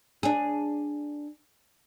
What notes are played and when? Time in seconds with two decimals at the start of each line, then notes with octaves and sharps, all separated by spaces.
0.23 D4 G#4